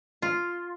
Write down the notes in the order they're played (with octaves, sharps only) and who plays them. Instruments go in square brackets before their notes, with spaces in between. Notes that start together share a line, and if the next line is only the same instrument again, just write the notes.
[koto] F4